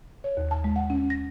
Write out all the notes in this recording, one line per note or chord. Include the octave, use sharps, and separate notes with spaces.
C#5
D#2
A5
G#3
F#5
C#4
A#6